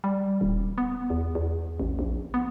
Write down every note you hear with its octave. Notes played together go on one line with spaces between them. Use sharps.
G3
D#1
B3
E2
E2
A1
A#1
B3